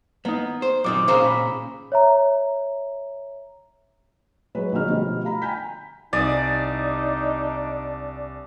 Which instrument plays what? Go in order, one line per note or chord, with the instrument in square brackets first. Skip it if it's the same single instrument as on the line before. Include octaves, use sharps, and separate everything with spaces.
[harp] A#3 D#4 [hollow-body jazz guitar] B3
[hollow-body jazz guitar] C5
[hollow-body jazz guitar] F#2 A#2 D#3 [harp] D6 D#6
[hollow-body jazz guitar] A#2 C#3 C5 [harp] F5 A#5
[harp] B5
[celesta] C#5 E5 A#5
[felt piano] F#3 G#3 B4
A#1 D3 F#3 G#3 D#4 F6
B2 D3 F3 G3 A3
F5 A#5 B5
G5 G#5 A#5 G6 B6
[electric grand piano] C2 G#5 D#6 [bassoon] D4 [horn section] D#4 [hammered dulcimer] D5